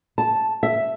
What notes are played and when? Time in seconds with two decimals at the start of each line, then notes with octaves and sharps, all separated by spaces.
0.18 A5
0.63 E5